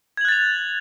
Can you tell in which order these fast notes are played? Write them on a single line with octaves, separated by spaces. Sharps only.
G#6 F#7 F#6 A6 F7